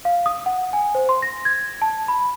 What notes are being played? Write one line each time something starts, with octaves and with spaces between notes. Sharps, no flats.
F5
D#6
F#5
G#5
C5
C6
A#6
G#6
A5
B5